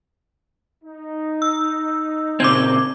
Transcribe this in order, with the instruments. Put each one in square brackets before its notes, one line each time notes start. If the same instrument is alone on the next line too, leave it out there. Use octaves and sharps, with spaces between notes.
[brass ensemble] D#4
[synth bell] E6
[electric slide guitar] A#2 C#3 C4 [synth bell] D6 G#6